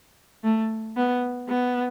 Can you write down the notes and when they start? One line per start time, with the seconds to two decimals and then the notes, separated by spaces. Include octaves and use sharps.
0.43 A3
0.97 B3
1.48 B3